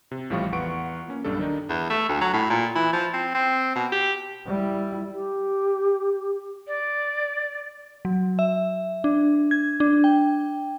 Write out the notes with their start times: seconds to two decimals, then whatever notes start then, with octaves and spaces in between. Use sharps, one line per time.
0.11 C3
0.30 A1 A2 F3 G3 F5 C#6
0.52 E2 F4 B4 F#5 C#6 D7
1.08 A#3 C#4
1.24 B1 G2 G3 D4 A4
1.39 D#3 D4 D#4
1.69 E2
1.90 A3
2.09 D2
2.21 F#3
2.33 A2
2.50 A#2
2.75 E3
2.93 F3
3.14 C4
3.35 C4
3.76 B2
3.92 G4
4.47 G3 E4
5.13 G4
6.67 D5
8.05 F#3
8.39 E5
9.04 D4
9.51 G#6
9.80 D4
10.04 G5